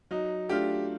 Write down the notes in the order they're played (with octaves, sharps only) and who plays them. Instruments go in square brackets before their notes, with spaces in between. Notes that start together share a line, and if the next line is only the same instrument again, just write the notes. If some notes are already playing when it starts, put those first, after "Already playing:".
[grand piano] F#3 [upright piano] D#4
[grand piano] A3 D4 F4 [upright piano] G4